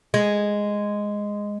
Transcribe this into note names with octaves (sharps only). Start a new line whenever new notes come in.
G#3